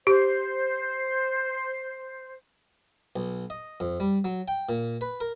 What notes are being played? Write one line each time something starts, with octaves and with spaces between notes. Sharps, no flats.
G4 C5
B1
D#5
F2
G3
F#3
G5
A#2
B4
A#4